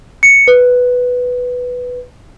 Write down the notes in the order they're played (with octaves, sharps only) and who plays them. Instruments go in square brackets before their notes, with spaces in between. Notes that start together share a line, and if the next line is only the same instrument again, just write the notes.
[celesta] C#7
B4